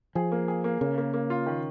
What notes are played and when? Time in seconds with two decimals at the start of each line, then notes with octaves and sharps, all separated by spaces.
0.15 F3 G#4
0.32 A#3
0.48 G#4
0.64 A#3
0.81 C#3 A#3
0.98 A#3
1.14 A#3
1.30 F4
1.46 D#3